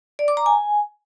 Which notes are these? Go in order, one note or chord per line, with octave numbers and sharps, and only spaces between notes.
D5
D6
A#5
G#5